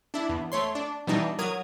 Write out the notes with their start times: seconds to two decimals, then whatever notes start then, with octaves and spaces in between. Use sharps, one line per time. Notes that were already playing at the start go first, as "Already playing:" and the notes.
0.14 D4 E4
0.29 E2
0.52 A3 C#5 C6
0.75 D4
1.07 B2 E3 G3 D4 D#4
1.38 F#3 A#4 D#6 G#6